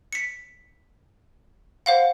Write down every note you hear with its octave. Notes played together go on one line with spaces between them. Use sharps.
B6 C#7
C5 F5 F#5